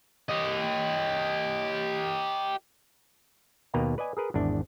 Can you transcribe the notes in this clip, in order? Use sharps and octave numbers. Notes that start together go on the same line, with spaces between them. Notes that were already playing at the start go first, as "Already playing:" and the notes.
G4 D#5
D#2 B2 A#3 B4 G5 A#5
B4 D5 D#5 G#5
G#4 A#4 B4
G#1 E2 D4